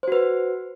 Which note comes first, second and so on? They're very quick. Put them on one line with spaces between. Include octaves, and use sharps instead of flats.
C5 F#4 B4